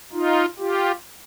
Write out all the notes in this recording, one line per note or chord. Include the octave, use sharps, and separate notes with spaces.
D#4 F4
F4 G4